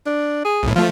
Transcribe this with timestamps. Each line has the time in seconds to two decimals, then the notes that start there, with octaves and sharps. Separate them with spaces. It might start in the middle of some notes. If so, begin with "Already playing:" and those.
0.06 D4
0.45 G#4
0.63 B1 A2
0.76 F3 A3 F4